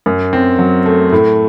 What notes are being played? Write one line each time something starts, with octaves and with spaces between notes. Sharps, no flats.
F#2
C4
F#3
A3
A2